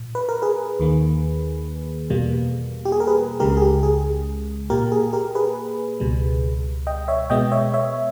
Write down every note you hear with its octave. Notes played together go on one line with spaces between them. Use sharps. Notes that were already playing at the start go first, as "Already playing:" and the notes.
Already playing: A#2
B4
A#4
G#4 B4
D#2 D#3 A#3
E2 B2 G3 A#3
G4
G#4
A#4
G#4 B4
C#2 C#3 G#3 G4 A#4
G#4
G4
G#4
A#2 A#3 G4 A#4
G#4
G4 A#4
G#4 B4
C#2 B2 G3
D#5 G5
C#5 E5
B2 G#3 B3 D#5 G5
C#5 E5
C#5 E5